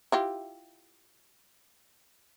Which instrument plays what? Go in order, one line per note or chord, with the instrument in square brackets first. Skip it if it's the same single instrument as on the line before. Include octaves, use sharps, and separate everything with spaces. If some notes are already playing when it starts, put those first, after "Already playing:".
[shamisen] E4 F4 G4